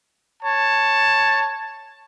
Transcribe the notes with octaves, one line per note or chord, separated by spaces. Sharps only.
C#5 A5